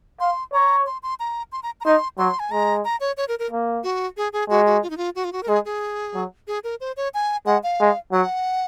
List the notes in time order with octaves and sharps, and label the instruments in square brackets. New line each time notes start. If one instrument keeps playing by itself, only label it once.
[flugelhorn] F5 [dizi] C6
[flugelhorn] C#5 [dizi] A#5
[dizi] C6
C6
A#5
C6
A#5
A#5
[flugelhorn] D#4 [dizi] C6
[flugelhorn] F#3 [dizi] C6
[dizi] G#5
[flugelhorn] G#3 [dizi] A#5
[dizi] A#5
C#5
C#5
A#4
A#4
[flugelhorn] A#3
[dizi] F#4
G#4
G#4
[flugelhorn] G#3 [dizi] F#4
[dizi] F#4
F4
D#4
F4
F#4
F4
F#4
A#4
[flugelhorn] G#3 [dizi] G#4
[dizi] G#4
[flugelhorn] F#3
[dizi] G#4
A#4
C5
C#5
G#5
[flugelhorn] G#3 [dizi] F#5
[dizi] F5
[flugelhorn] G#3
[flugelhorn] F#3 [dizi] F#5